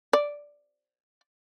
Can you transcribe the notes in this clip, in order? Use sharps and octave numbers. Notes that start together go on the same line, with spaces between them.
D5